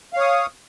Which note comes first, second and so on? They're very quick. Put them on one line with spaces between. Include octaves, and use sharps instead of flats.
F5 C#5 D#6